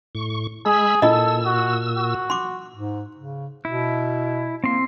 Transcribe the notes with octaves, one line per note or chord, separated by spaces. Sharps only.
A2 C#6
G#3 G#4 B5 E6
A#2 E4 F4 A4 D#5 E6
F#4
F#4
C6 D6
G#2
C#3
B2 E4
A#3 C4 C6